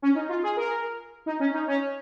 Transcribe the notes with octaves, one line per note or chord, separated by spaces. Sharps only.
C#4
D#4
F4
G#4
A#4
D#4
C#4
D#4
C#4